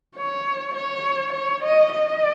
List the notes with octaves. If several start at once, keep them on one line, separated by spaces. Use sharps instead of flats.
C#5
C#5
C#5
D#5
D#5